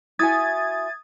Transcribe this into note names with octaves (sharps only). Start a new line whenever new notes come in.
E4 F#4 G#5 D#6 G#6 A6